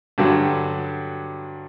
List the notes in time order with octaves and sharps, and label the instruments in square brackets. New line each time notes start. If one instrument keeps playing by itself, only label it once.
[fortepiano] G2 D3 F#3 G3